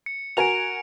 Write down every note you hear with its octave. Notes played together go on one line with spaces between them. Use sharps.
C#7
F#4 A#4 G#5 D7 F7